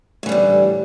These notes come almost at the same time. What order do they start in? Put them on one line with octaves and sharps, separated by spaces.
A2 E3 G3 D3